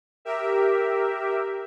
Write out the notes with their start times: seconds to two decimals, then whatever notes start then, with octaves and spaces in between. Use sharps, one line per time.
0.25 G4 A#4 E5